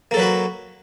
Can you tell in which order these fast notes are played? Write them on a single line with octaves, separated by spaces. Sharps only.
A#3 A4 F#3 B4 F#4